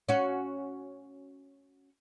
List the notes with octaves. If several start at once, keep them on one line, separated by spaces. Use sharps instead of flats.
C#4 F#4